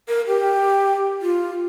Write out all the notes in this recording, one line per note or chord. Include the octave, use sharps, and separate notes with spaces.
A#4
G4
F4